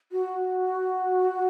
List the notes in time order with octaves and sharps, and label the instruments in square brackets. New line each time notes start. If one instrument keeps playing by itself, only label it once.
[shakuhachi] F#4